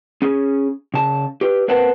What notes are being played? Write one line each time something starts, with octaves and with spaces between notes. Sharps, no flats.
C#4 G#4
C#3 A5
G4 B4
A#3 C4 B4 C5 F#5 A5